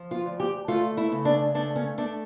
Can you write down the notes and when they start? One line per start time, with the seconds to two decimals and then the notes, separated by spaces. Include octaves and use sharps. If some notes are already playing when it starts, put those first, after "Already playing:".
Already playing: F3
0.11 F4
0.26 D2
0.40 G4
0.68 A3 F4
0.97 E4
1.12 C#3
1.25 D4
1.54 A3 D4
1.76 C#4
1.98 A3 D4